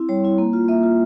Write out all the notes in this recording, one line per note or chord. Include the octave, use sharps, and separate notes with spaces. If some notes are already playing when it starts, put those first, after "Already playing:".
Already playing: C4 E4
G3 C#5
C4 E4
A#3
F4
A#3 E5
F4